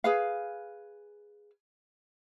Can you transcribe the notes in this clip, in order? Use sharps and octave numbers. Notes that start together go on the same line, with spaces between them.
G#4 B4 F5